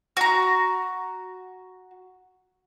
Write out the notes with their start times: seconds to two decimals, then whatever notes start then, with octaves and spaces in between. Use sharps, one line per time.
0.17 F#4 A#5